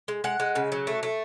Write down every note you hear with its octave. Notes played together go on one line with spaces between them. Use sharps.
G#3
G#3 F#5
G#3
C#3
F#3
A3
A3